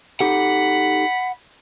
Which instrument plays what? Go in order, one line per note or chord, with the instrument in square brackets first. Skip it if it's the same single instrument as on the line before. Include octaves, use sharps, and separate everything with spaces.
[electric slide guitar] D#4 G4 A4 [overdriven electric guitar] F#5 [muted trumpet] B5